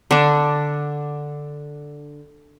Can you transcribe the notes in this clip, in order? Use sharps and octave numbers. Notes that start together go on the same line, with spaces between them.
D3 D4